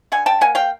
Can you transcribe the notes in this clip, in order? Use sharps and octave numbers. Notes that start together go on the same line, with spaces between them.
D3 F#5 G#5
G5 A5
A#3 F#5 G#5
F5 G5